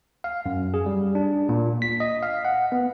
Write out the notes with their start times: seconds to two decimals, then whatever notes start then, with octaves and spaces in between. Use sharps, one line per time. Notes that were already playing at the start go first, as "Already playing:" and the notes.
0.24 F5
0.46 F#2
0.74 G#4
0.86 G3
1.15 D4
1.49 A#2
1.82 B6
2.00 D#5
2.23 F5
2.45 F#5
2.72 B3